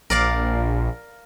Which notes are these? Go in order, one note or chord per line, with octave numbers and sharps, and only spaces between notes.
A#1 A#4 D5 F5